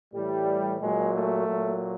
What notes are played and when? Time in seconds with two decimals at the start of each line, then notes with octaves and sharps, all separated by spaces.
0.13 A2 E3 G3
0.80 A#2 F#3 G#3
1.14 A3
1.48 A#2 F#3